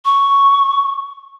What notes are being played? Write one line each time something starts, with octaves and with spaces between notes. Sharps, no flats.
C#6